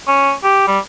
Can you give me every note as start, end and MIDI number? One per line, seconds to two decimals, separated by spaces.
0.08 0.32 61
0.44 0.64 67
0.67 0.79 55